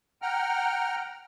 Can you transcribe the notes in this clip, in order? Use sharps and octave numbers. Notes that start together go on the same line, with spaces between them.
F#5 G5 A#5 F6